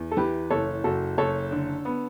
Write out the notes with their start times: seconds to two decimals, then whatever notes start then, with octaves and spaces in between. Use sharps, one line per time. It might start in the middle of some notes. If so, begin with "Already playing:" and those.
Already playing: E2
0.12 A4
0.17 E3 G4 B4
0.50 F#1 A4 C#5
0.84 F#1 F#4 A4
1.18 F#1 A4 C#5
1.51 D3
1.85 B3